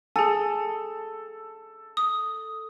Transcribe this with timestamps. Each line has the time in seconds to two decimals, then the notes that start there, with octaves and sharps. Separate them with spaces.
0.16 G#4 A4 G#5
1.97 D#6